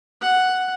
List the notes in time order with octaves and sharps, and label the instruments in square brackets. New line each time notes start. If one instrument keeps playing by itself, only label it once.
[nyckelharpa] F#5